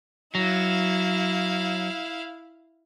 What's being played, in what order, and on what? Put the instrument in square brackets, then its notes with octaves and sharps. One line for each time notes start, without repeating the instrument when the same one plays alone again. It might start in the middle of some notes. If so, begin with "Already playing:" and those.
[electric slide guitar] F#3 [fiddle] E4 F5